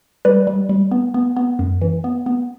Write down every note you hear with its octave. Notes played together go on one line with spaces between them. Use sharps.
G3 B4 D5
G3
G3
B3
B3
B3
F#2
E3
B3
B3